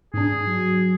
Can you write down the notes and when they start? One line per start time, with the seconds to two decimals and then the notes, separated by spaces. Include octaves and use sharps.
0.14 G#2 D4 G#4
0.46 F#3